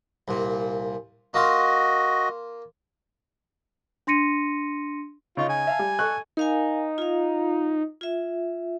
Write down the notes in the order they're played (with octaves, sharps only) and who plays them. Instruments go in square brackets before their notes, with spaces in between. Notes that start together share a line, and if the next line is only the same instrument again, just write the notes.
[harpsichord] C2 A#2
[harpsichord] A#3 F4 [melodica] F#4 D#5
[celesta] D4 C6 A#6 C#7 D#7
[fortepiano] C#3 D#4 C#6 [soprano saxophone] F4
[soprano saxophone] G#5
[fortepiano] E5 F5 A5
G3
A4 C#6 F#6
[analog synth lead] D#4 [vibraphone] A#4 F5 G#5
[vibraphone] F4 F5
F4 E5